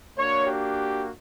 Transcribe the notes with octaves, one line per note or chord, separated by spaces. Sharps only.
A#3 D4 F#4 C#5
G4